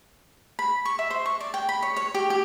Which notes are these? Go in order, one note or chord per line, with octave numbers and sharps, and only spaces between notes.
B5
C#6
E5
C5
C#6
D5
G5
B5
C#5
C#5
G4
G4